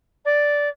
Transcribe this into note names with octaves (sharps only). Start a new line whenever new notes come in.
D5